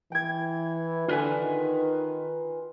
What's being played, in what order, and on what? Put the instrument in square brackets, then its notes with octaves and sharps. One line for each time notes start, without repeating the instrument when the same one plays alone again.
[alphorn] E3 [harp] G5 G#6
[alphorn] D3 [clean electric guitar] F4 B4 G#5
[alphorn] D#3